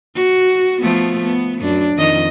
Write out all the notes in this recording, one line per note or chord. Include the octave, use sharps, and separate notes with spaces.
F#4
F3 A3 B3
B3
F#2 D4
F2 D#3 D#5